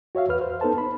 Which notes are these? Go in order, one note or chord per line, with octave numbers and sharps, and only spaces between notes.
F#4 C#5 E5 F5
E2 B4 F6
C5
B3 D#4 A4 B4 C5 A5
B5